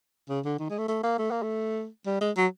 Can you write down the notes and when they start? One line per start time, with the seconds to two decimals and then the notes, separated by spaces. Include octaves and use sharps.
0.29 C#3
0.45 D3
0.59 D#3
0.69 G#3
0.78 A3
0.88 A3
1.03 A#3
1.18 A3
1.31 A#3
1.42 A3
2.06 G3
2.21 G#3
2.37 F#3